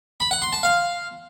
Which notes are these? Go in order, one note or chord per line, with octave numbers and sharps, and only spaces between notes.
B5
F#5
C6
A5
F5